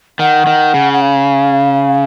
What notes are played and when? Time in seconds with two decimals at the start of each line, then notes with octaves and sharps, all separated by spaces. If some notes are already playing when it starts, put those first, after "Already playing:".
0.19 D#3 F#5
0.47 D#3
0.74 C#3
0.93 F#5
1.01 F5